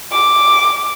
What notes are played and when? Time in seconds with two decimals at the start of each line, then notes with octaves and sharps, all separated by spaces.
0.12 D6